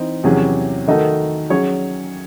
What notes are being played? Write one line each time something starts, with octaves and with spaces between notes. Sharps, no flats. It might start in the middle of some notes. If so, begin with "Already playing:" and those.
Already playing: E3 C4 D#4
E2 C3 F#3 C#4 G#4
D#3 A3 D#4 F#4 A4
F#3 C#4 G#4 C#5